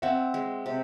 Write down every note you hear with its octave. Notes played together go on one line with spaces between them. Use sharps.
C4 E5 F#5
G#3
C3